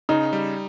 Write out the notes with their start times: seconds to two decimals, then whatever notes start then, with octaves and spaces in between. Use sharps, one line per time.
0.09 C#3 D#4
0.33 G3